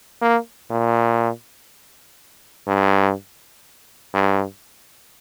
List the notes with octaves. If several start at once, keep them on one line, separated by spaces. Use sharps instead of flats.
A#3
A#2
G2
G2